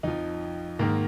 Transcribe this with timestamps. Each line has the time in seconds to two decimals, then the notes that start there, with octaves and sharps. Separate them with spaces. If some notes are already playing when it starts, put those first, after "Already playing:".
0.03 F2 F3 D#4
0.79 G#2 D#3 A#3